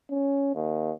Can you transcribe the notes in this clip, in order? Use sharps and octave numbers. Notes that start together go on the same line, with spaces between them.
C#4
D#2